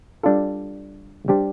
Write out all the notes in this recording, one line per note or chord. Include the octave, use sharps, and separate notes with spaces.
G3 D4 F4 A4
G3 D4 G4 C5